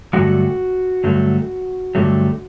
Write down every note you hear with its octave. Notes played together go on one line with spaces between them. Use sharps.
G2 D3 F#3 A3 F#4
G2 D3 F#3 A3
G2 D3 F#3 A3